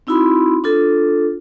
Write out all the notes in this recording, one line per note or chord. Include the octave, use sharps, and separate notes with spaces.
C4 D#4 E4 F#4 B5 C6
D4 F4 A4